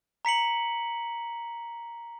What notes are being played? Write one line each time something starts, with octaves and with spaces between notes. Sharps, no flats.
A#5 B6 C#7 F#7